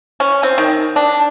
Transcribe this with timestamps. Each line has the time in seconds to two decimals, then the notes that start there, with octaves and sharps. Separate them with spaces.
0.20 C#4
0.43 C4
0.58 D#3
0.96 D4